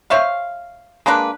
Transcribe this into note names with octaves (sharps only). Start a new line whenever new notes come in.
C5 C#5 E5 F5
G#3 A#3 D4 B4